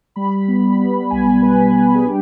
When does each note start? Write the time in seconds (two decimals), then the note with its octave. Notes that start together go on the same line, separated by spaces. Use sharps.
0.16 G3 B5
0.48 B3
0.79 B3
1.10 B1 G#5
1.42 B3 B4
1.74 G3 B4
1.95 G#4
2.06 D4 G4